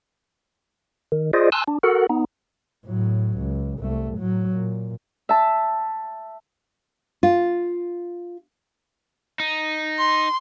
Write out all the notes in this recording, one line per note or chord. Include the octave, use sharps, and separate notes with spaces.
D#3
F4 G#4 C5 D5 D#5
G#5 A5 C6 E6 F#6
D4
F#4 A4 A#4 F#5
B3 D#4
A2 F#3
C#2
C2 A3
A2 F#3
A#2
E5 A5
F4
D#4
C6